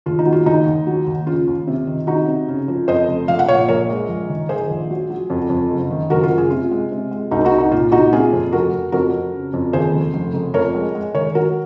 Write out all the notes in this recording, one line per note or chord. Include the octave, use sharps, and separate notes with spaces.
D#2 F4
D#4
F#3
F4
D#2 D#4
D#2
F#3
D#2
C#3 F4
D#2
C3
D#3
C3 D#4 F#4
C3
C#3
F3
F2 C5 D#5
F1
A#1 F5
F#5
A#2 C#5 F5
A#1 A#4 C#5
G#3
A#1
D#3
D#3 G#4 C5
A#1
F#3
F#3
F2
F2
F#1
D#3
F#1 F#4 A#4
F4
F#1
F4 G#4
C3 F4
G#3
C3
G#3
C2 D#4 F#4
D#4 F#4
C2
D#4
A#2 F4
A#2 D#4 F#4
C3 F4 G#4
F2
F1 F#4 A#4
F1
F2 F#4 A#4
F2
C#3
F2
D#2 G#4 C5
F1
F1
F1
F2 A#4 C#5
G#3
G#3
D#3 A#4 C#5
F#3 F#4 A#4